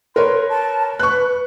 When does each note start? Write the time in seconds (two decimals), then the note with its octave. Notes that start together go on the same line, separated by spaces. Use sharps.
0.16 A#4 B4 C#5 C6
0.49 A5
0.99 B4 C#6 F#6